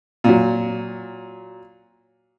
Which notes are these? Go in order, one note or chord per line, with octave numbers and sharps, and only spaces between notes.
A#2 F#3